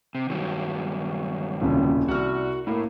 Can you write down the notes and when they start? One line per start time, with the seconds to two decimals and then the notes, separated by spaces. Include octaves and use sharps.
0.15 C3
0.29 G2 D#3 F#3
1.61 D#1 C2 C#3
2.08 C2 F#4 D5 F6
2.67 A2 A#3 E4